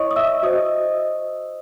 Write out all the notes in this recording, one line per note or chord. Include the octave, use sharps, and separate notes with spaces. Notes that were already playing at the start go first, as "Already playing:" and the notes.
Already playing: E4 C#5 D#5 C#6 D#6
D#6
E5 E6
F#4 C5 D#5 D#6